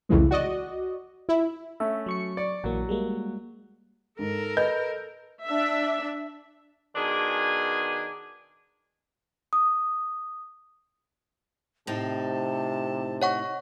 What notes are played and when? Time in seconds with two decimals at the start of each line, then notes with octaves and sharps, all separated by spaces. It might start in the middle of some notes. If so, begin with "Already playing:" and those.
0.09 C2 F2 C#3 E3 G#3
0.31 F#4 D5 D#5
1.29 E4
1.80 A3 C#4 E5
2.06 F#3 C#6 C#7
2.37 D5
2.64 A#1 E3 F#3 A#3
2.89 G3 G#3 A#3
4.19 G#2 A4 A#4
4.57 B4 D#5 G6
5.45 D4 E5
6.96 B2 D#3 D4 G#4 G#5
9.53 D#6
11.87 A2 C3 C4 D#4 A5
13.22 C#5 D#5 F#5 C#6